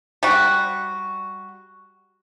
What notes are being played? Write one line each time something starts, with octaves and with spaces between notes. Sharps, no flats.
G3 F#4